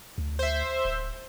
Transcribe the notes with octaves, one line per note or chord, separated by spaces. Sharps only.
D2
C5 E5
D1